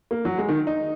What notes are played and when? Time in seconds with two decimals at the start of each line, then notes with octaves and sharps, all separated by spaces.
0.11 A#3
0.25 F#3
0.38 G#3
0.49 D#3
0.67 D#4